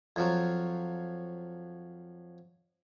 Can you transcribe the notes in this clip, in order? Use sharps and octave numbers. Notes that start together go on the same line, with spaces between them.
F2 F3 F#3